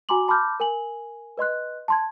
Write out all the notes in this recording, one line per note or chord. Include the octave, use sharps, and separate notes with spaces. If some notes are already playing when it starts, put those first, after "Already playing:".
F#4 G#5 A#5 C6 D6 F#7
A5 B5 C6 D6 F6 G6
A#4 G#5 F#7
B4 D#5 C6 F#6
A5 C6 G#6